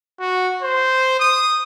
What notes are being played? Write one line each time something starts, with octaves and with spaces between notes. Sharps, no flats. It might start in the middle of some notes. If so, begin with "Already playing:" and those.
F#4
C5
D#6